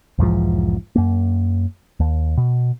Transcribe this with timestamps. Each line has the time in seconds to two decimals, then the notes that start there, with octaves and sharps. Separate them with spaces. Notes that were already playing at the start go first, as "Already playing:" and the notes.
0.18 B1 E2 G#2 F3
0.95 F#2 A#3
2.00 D#2
2.37 B2